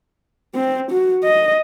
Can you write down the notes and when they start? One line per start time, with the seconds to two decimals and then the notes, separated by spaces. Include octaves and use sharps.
0.55 C4
0.91 F#4
1.24 D#5